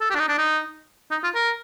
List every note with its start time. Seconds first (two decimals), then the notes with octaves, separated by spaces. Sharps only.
0.01 A4
0.10 G4
0.15 D4
0.19 D#4
0.28 D4
0.38 D#4
1.11 D#4
1.23 F4
1.35 A#4